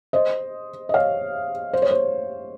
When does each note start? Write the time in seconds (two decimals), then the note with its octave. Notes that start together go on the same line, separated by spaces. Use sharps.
0.13 C5 D#5
0.89 D#5
0.94 C#5 F5
1.73 C5
1.82 C#5
1.91 C5